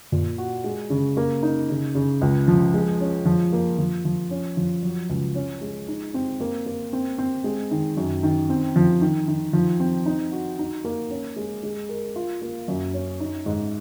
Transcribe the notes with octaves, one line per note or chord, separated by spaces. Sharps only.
A#2
F#4
G#3
C#3
A#3
D#4
C#3
C#3
C#2
F3
G#3
C#4
F3
A#3
F3
F3
C#4
F3
F#3
C#2
C#4
G#3
D#4
C4
A#3
A#3
C4
C4
G#3
D#3
F#2
D#3
C4
F3
D#3
D#3
F3
C4
D#4
F#4
D#4
A#3
C#4
G#3
G#3
A#4
F4
A#3
F#2
C#4
D#4
G#2